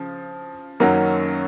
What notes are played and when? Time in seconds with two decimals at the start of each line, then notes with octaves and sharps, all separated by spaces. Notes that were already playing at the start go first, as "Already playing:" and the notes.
Already playing: C#3 F3
0.80 F#2 D#3 F#3 A#3 C#4